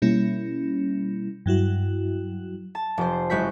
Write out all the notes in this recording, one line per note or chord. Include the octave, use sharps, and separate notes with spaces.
B2 G3 A#3 C#4 E4
G2 F#3 E4 F#4
A5
F1 C5
F#1 G#3 F#4 G6 B6